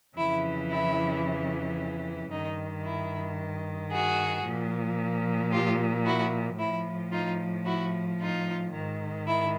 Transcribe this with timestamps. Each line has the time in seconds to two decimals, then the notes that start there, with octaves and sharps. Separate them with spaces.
0.16 F2 C#3 E3 E4
0.69 E4
2.31 G2 D#3 D#4
2.84 E4
3.91 F#4 G#4
4.44 A#2 F3
5.51 F4 G4
6.05 E4 F#4
6.59 A2 F3 E4
7.12 D#4 F4
7.65 E4 F#4
8.19 D#4 F4
8.73 G#2 D#3
9.27 E4